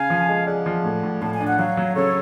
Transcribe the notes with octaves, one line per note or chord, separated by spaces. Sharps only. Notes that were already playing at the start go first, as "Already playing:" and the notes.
Already playing: C#3 F5 G#5
F3
G#3
G#4 D5 F#5
F3
A2
A2
A2 A5
G#5
D4
F#5
F#3 C#5 F5
F#3
C#3 A4 C#5